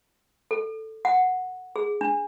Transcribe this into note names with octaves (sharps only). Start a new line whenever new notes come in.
A4
F#5
G#4
D4